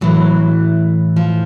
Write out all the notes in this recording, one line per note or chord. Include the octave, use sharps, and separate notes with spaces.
A2 E3 F#3
F3